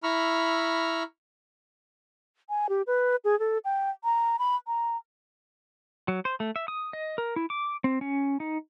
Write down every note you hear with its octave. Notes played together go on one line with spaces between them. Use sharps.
E4 A#5 B5 C#6 E6 F6
G#5
G4
B4
G#4
A4
G5
A#5
B5
A#5
F#3
C5
A3
E5
D#6
D#5
A#4
E4
D6
C4
C#4
D#4